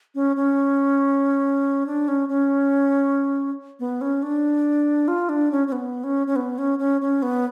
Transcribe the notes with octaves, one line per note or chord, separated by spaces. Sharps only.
C#4
C#4
D4
C#4
C#4
B3
C#4
D4
F4
D4
C#4
C#4
B3
C#4
C#4
B3
C#4
C#4
C#4
B3